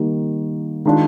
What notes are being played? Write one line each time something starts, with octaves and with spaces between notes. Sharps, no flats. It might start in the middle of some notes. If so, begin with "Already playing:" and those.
Already playing: D#3 G3 A#3
D#3 G#3 D4 F4